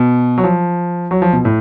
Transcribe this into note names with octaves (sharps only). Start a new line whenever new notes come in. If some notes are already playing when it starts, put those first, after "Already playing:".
Already playing: B2
F#3
F3
F#3
F3
B2
A2